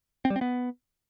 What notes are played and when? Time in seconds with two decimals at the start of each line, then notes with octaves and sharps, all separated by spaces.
0.25 C4
0.30 G3
0.36 C4
0.41 B3